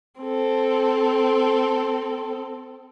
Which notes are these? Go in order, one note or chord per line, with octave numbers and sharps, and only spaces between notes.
C4 A4